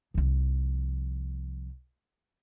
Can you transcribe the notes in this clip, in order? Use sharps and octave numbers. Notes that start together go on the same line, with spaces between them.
C2 F3